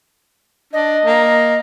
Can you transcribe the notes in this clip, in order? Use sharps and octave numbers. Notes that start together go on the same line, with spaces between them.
D4 D#5
A#3